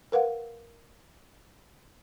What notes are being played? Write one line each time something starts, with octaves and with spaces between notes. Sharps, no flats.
A#4 B4 F5 F#5